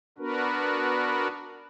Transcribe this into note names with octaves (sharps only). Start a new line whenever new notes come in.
B3 D4 F#4 A#4 B4